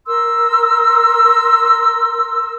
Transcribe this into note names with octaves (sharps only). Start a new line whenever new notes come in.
A#4 C6 E6